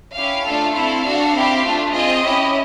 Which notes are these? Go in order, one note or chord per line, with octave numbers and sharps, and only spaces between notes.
C#4 E4 G4 F5
A3 D4 F4 A4
C4 E4 A4 F5
D4 F#4 A4
C4 E4 G4
A3 D4 F4
C4 F4 G#4 D#5
C#4 E4 G4